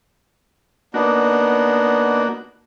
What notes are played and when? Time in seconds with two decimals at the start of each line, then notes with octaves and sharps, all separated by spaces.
0.94 A#3 B3 D4 D#4 F#4